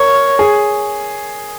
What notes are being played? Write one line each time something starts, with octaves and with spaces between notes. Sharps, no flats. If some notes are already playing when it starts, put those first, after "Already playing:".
Already playing: A#4 C#5
G#4